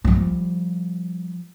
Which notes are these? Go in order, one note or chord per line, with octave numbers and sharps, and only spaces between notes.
F3 G3